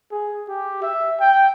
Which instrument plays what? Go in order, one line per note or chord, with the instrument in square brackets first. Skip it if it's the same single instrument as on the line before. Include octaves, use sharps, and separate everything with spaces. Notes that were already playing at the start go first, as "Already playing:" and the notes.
[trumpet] G#4
G4
E5
G5